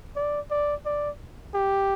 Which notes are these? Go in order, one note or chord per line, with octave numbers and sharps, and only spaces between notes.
D5
D5
D5
G4